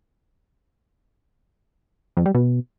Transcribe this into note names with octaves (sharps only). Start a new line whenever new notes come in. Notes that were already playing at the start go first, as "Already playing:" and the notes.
F2
G3
B2